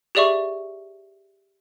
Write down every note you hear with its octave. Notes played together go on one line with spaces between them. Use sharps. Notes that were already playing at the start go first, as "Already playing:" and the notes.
G4 G#4 D5 E5 C#6